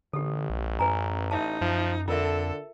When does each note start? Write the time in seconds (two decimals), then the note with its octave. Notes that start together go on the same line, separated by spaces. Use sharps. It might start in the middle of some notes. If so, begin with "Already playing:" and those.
0.13 A1 D3 G4 A4
0.50 B1
0.79 F#2 B4 G#5 A#5
1.31 D#4 E5 A5
1.61 F#2 F3
2.08 F2 D3 F4 A4 A#4 E5